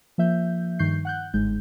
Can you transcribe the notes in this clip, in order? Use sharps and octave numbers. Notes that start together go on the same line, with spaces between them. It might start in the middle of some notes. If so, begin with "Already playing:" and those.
F3 A#3 E5 G6
G2 D#3 C#6 G6 C7
F#5 F#6 G6
G1 G#2 G#3 G6